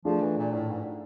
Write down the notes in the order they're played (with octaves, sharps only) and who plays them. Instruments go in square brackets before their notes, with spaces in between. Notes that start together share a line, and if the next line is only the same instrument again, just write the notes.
[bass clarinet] F3 [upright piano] A3 D4 F4 G#4
[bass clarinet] E3
A#2
A2
G#2